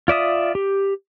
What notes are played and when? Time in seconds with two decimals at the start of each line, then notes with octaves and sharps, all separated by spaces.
0.08 F4 D5 E5 D#6
0.55 G4